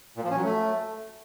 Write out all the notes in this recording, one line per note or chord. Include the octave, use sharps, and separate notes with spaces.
A#2
F3
C#4
F#3
A3